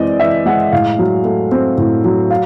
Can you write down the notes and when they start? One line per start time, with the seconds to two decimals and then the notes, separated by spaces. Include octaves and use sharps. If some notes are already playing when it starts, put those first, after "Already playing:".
Already playing: E3 G#3 C4 D5 D#5
0.20 E3 E5
0.46 G#3 F#5
0.72 A2 F5
0.99 F#3
1.25 A3
1.52 C4
1.78 A2
2.04 F#3
2.30 F5